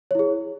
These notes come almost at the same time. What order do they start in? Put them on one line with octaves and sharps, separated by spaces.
C#5 E4 G#4